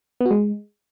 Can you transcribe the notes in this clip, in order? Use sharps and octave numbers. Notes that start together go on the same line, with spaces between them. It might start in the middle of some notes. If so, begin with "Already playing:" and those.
B3
F#4
G#3